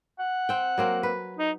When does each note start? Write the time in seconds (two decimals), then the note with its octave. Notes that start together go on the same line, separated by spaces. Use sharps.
0.19 F#5
0.49 C4 G5
0.78 F#3 A#3 C4
1.03 B4
1.38 D#4